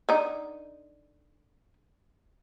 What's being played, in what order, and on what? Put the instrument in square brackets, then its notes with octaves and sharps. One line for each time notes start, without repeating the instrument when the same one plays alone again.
[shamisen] D3 D#4